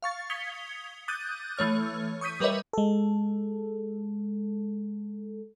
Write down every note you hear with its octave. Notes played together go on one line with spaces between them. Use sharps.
F5 C#6 A6
D#6 G#6 B6 C#7 F7 G7
D6 D#6 F#6 G6 A6 D#7
E3 A3 C#5 F6
C#6 D#6 G6 B6 D#7
G3 A#4 B4 C#5 D#5 E5
G#3 A4